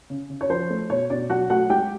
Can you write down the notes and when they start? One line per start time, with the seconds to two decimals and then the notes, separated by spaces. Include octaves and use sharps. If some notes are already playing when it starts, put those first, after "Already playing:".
0.10 C#3
0.30 C#3
0.41 C#5
0.50 F3 C5
0.70 A3
0.90 B2 C#5
1.10 B2 D4 D5
1.29 F#3 F#4 F#5
1.50 A3 F#4 F#5
1.70 G#3 G4 G5